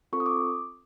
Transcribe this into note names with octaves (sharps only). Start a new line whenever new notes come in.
C4 F4 A4 C#6
D#6
D6